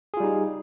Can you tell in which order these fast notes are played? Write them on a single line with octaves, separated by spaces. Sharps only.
G#4 F4 G3 D#4